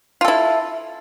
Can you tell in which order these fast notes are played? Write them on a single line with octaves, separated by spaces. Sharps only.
F4 A4 E4